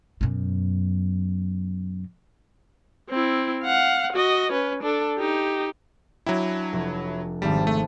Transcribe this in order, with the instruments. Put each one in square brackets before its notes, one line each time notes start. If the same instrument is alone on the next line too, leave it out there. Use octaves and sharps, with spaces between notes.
[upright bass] F#2 B2
[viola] C4 E4
F5 F#5
F#4 D#5
C#4 B4
D4 A4
D#4 G4
[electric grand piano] F#3 E4 [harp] D4 G5 A#5
[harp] F1
[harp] G#1 C4 A5 [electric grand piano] G3
[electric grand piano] A3